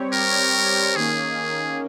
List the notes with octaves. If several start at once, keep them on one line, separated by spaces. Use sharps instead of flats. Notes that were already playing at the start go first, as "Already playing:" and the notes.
Already playing: G3 C4 G4 C#5
A#4
D#3 A#3 C#4 G#4